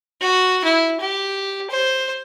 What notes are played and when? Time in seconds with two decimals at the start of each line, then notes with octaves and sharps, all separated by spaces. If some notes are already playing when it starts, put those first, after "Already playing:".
0.21 F#4
0.64 E4
1.01 G4
1.70 C5